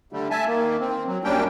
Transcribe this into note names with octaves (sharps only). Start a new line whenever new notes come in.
D3 G3 A3
E5 G#5 A5
D#3 A#3
C4
F#3
F#2 G3 A#3 C#4 D4 G5